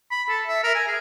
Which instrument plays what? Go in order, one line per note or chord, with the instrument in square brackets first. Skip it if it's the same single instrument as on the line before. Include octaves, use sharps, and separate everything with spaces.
[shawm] B5
A4
E5
A#4
G#5
G#4